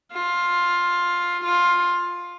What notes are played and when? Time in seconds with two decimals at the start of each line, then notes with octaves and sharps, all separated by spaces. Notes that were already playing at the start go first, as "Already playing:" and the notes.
0.12 F4
1.44 F4